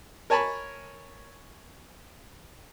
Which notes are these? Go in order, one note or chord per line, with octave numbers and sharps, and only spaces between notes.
A#4 C#5 G#5 A5 B5 C#6